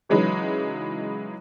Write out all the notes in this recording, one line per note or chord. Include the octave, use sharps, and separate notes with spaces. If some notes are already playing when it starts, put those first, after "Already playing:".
C#3 E3 F#3 G#3 D#4 B4